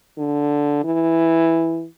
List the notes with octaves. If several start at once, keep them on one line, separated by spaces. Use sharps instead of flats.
D3
E3